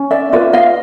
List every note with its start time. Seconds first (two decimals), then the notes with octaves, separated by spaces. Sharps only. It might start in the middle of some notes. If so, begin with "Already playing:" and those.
Already playing: C#4
0.11 D5 E5
0.32 F4 G#4 B4 D5 E5
0.53 D#5 F5